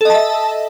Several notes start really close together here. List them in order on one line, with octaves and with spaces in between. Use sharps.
A4 D#5 A5 E5